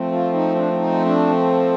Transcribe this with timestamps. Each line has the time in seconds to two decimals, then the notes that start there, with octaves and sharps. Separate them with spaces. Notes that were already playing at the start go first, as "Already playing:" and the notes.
Already playing: F3 A3 C4
0.12 F4
0.34 D#4
0.55 D4
0.73 D4
0.77 D#4
1.05 D4